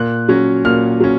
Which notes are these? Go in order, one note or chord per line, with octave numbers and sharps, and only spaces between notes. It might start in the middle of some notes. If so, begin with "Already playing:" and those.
Already playing: A#2 F#6
F#3 C#4
A#2 F6
F#3 C#4